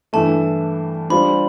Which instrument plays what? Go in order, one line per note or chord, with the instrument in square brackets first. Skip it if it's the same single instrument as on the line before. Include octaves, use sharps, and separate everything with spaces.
[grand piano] G2 E3 A3 [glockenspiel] A5
[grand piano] G3 D4 F4 C5 [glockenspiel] B5